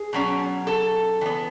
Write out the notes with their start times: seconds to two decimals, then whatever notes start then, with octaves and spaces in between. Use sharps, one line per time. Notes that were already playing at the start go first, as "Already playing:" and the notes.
Already playing: G#4
0.13 B2 F#3 C#4
0.67 A4
1.21 E3 B3